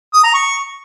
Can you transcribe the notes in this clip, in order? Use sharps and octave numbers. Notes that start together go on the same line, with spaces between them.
D#6
A#5
C#6